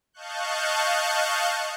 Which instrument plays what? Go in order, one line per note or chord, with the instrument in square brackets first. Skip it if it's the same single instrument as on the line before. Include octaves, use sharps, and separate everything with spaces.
[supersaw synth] D#5 F5 A5 C#6 F#6 G6